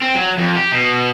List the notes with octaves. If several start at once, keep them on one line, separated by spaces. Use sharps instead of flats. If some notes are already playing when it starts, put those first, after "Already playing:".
C4
F#3
F2
G4
B2